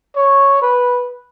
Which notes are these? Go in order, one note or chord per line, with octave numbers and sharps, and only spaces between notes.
C#5
B4